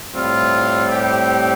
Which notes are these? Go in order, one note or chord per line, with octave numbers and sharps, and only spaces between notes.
A2 G3 C4 F4
G4